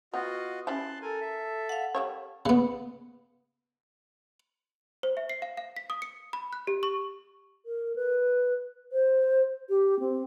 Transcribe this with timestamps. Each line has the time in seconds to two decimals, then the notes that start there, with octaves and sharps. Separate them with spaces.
0.14 B3 F4 F#4 D#5 G5
0.67 C#4 E4 G4 A5 C6 F#6
1.02 A4 A#4 G#5
1.21 E5
1.69 F5 F#5
1.95 G3 G4 C#5
2.46 C#3 B3
5.03 C5
5.17 E5
5.29 C7
5.42 F5
5.57 F5
5.77 B6
5.90 D#6
6.02 C#7
6.33 B5
6.53 F#6
6.67 G4
6.83 C#6
7.66 A#4
7.96 B4
8.92 C5
9.69 G4
9.99 C4